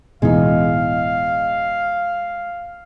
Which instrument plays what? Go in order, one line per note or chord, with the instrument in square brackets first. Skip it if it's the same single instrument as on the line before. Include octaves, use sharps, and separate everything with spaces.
[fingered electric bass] D1 B2 E3 [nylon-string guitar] G#3 D#4 [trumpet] F5